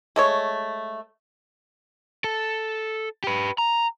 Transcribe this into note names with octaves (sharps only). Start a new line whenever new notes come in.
G#3 A3 C#5
A4
G4 B4
A#5